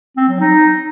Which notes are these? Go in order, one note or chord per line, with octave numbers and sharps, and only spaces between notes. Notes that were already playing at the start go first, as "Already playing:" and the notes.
C4
F#3
D#4